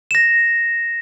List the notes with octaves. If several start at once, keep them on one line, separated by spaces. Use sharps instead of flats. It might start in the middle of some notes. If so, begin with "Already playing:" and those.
A#6 E7